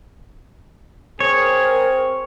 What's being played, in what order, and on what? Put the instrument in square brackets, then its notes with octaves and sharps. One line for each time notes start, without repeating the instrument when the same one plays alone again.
[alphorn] C4 [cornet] G#4 [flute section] A#4 [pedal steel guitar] C#5